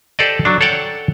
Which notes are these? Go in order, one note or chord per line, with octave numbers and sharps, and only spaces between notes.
G4 A4 C5 D5 D#5
F#3 D4
A4 C#5 D5 F#5 G5 A5